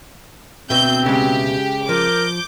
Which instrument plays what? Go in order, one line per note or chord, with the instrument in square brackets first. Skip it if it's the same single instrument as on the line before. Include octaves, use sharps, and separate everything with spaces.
[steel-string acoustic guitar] D2 B2 E5 [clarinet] C4 [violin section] G6
[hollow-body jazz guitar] C#3 G#3 [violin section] G4
[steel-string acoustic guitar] F3 [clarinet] A#4 [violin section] D6 G6